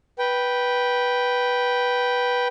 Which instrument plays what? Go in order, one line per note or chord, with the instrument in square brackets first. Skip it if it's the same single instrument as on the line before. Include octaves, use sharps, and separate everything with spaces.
[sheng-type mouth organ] B4 G5